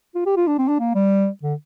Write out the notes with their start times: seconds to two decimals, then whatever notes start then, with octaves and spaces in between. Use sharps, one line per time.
0.15 F4
0.26 G4
0.36 F4
0.47 D4
0.58 C4
0.68 D4
0.79 A#3
0.95 G3
1.43 D3